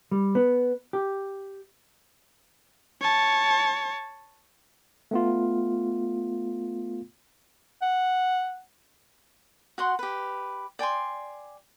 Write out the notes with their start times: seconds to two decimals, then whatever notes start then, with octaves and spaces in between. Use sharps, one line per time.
0.11 G3
0.35 B3
0.93 G4
3.01 C#5 A5
5.11 A3 B3 F4
7.82 F#5
9.78 F#4 F#5 C6
9.99 G4 B4
10.79 D5 G5 G#5 C6